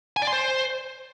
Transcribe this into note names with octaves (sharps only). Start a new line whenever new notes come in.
G#5
D5
C6
C5